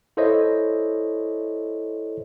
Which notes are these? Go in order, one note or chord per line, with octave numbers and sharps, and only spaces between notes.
E4 A4 C5 C#5 D#5 E5